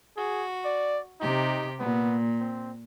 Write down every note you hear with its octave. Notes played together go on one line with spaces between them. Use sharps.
F#4 G#4
D5
C3 D#4 G4
A#2 B3
C4